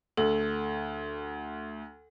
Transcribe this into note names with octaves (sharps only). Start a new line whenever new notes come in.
D2 A4